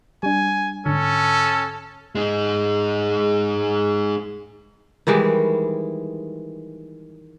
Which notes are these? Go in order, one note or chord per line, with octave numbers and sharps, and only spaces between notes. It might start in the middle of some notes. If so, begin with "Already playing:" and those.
G3 D4 G#5
G#2 D3 C#4 A4
G#3 D#4
D#3 E3 G3 G#3